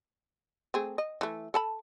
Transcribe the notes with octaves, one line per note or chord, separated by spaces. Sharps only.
A3 C4 G#4
D#5
E3 A3
A4 A5 B5